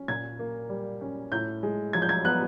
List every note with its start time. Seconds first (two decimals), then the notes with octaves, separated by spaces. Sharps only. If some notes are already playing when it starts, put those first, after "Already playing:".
Already playing: C#4
0.08 A#2 G#6
0.39 A#3
0.69 G3
1.01 C#4
1.32 A2 G6
1.63 G#3
1.93 F3 G#6
2.02 G6
2.09 G#6
2.24 B3 F#6